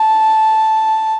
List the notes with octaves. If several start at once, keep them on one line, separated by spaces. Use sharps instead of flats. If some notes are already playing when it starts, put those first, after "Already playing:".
Already playing: A5